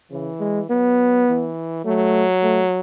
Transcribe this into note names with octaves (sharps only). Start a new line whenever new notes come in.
C#3 E3
G#3
F#3 B3
E3
F#3 A3
A3